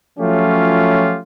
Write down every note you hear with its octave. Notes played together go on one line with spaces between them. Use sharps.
F3 F#3 A3 C#4 F4 G4